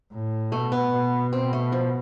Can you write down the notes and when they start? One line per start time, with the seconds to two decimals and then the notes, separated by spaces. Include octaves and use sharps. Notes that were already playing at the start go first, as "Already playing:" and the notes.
0.12 A2
0.51 B2 A3
0.72 B3
0.92 B2
1.33 C4
1.53 A3
1.72 F3